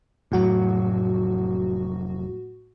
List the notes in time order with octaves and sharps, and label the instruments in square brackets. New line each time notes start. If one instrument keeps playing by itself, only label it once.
[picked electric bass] F1 F#3 [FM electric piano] A2 F#4